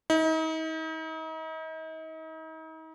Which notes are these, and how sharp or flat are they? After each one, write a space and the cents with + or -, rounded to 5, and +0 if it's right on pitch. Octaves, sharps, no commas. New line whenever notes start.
D#4 +40